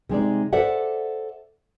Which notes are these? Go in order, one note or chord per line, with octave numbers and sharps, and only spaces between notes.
C3 G#3 D#4 D5
A4 C5 D5 E5 F#5